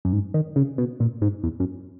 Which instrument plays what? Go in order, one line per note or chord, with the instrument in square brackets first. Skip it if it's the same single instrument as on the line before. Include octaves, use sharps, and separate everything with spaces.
[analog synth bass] F#2
G#2
D#3
C#3
B2
A#2
G#2
E2
F#2